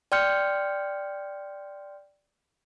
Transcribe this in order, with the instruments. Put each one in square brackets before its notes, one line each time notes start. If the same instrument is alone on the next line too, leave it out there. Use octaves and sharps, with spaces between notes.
[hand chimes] D5 G5 C6 F6 G6 C#7